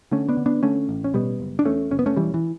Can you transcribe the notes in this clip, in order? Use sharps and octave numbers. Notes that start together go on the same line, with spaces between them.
D3 A3 C#4
B3 D4
D3
B3 D4
D3 A3 C#4
A1
C#4
B2 G3 B3
F#1
D4
E2 A3 C#4
F#1 C#4
B3
A3 C#4
E1 E3 G3
E3